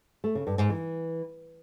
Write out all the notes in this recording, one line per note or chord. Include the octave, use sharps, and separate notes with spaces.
A3
C#3
G2
G#2
E3